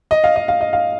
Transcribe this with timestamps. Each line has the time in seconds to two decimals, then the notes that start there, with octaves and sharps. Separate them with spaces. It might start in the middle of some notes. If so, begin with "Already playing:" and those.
0.11 D#5
0.24 F5
0.36 D#5
0.48 F5
0.61 D#5
0.73 F5